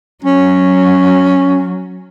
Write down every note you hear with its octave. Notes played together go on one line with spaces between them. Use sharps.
F#3 C#4